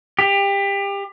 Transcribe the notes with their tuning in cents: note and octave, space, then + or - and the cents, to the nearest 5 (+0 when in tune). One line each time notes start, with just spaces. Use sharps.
G4 +25